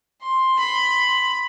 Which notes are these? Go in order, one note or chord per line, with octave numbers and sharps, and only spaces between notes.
C6
B5